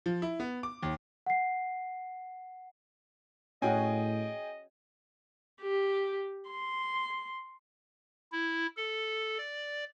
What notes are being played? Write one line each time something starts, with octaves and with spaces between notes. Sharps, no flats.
F3
E4
B3
D6
D#2
F#5 C7
A2 C#4 F#4 G#4 D#5 G5 G#5
G4
C6
E4
A4
D5